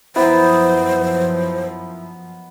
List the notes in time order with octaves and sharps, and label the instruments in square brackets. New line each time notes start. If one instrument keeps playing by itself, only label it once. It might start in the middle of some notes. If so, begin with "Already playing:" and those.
[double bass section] F#2 F3 [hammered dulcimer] B3 D#4 [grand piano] E4 [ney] C5